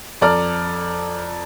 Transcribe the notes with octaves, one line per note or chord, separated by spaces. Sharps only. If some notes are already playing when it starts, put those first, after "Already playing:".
F2 A4 D5 A#5 F6